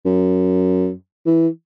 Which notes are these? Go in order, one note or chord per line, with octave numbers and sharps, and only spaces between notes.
F#2
E3